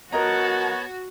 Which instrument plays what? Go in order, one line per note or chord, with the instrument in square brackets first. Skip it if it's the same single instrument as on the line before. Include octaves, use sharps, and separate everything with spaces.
[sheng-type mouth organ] B3 C#5 [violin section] F#4 [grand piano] A#4 D#5 A#5 [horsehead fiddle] F#5 A5